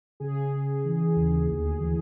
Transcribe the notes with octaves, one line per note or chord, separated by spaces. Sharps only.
C#3 G#4
C#3
E3
D#2
D2
E3